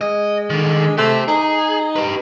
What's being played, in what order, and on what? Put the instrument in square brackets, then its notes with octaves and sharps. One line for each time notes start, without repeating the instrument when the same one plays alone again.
[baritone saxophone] G#3 [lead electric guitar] D#5
[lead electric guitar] D3 D#3
[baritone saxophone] A3 [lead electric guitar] G4 C5
[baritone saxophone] D#4 [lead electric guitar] G#4
[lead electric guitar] G4 B4